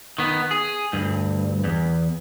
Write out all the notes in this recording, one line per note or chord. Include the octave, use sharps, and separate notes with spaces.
D#3 B3
G#4
D2 G2
E2